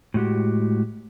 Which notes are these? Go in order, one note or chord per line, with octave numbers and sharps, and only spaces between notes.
A2 G#3 F#4 G4